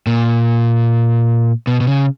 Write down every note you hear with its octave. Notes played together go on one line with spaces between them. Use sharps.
A#2
B2
B2
C#3